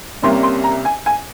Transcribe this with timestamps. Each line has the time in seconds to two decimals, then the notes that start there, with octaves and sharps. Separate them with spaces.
0.22 C2 C3 G3 A#3 C#4 C6
0.43 C6
0.64 A#5
0.85 G#5
1.06 G#5